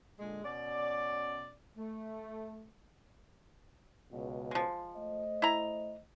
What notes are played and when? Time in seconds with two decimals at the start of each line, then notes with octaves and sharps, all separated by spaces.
0.20 A#2 D3 G#3
0.44 B2 C#4 D5
1.77 A3
4.12 C#2 B2
4.51 F3 G#3
4.97 A3 C5 D#5
5.42 E4 A#5